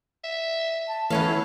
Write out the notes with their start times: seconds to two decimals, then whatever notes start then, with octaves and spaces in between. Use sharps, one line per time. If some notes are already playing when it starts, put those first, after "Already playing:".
0.24 E5
0.88 A5
1.10 E3 A3 B3 C#4 A4 C#5 F5
1.28 E4